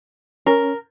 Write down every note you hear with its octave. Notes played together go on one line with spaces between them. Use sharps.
C#4 A#4